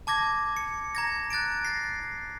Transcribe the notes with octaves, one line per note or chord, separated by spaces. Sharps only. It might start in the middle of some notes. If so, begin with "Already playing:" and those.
A5 D6 G#6 A#6
C#7
A#5 G#6 A#6
F#6 A6 A#6 D7
A6 A#6 C7